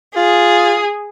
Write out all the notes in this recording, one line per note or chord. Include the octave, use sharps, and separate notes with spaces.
F4 G#4